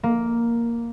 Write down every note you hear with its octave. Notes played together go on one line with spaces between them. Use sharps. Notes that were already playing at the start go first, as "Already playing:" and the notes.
A#3